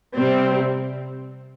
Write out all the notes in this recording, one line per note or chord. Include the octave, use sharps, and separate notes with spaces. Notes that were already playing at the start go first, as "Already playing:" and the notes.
C3 G3 C4